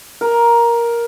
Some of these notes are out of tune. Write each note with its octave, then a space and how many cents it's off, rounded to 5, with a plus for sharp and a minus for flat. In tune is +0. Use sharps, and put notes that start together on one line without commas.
A#4 +10